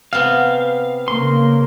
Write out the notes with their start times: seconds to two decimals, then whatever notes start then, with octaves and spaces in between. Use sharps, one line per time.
0.13 C3 B3 F5
1.08 C#3 A#3 C6